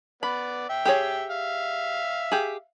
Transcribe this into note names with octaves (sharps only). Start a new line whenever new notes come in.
B3 D5 B5
E5 G5
G4 G#4 C#5
E5 F5
G4 G#4